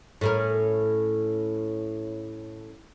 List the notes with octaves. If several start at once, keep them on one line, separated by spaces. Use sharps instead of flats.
A2 C#4 A#4